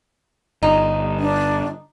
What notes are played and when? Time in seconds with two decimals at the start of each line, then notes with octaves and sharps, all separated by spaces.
0.63 G1 D#4
1.20 D4